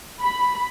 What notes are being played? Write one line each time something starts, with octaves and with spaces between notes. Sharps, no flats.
B5